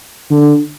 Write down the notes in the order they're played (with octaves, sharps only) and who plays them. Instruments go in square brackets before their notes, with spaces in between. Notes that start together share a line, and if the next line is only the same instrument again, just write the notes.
[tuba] D3